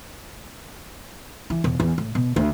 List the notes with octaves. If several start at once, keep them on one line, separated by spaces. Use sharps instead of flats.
E3
E1
E2
A2
B2
D2